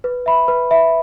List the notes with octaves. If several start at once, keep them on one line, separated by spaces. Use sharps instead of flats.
B4
E5 B5
B4
E5 B5